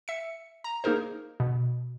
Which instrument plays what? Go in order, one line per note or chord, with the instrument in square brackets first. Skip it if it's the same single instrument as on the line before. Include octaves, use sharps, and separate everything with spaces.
[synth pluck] E5 C#7
A#5
A#3 D#4 G#4 A#4 C5
B2